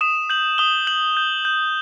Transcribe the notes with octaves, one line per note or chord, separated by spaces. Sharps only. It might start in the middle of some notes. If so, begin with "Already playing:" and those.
D#6 E7
G6 F#7
D#6 G7
G6 F#7
G6
G6